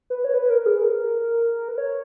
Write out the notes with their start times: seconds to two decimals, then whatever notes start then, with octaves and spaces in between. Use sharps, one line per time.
0.10 B4
0.24 C#5
0.34 B4
0.50 A#4
0.66 G#4
0.82 A#4
1.68 B4
1.78 C#5